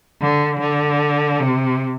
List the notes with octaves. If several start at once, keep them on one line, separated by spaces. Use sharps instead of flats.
D3
D3
C3